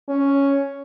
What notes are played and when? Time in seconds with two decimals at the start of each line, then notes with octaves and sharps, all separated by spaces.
0.09 C#4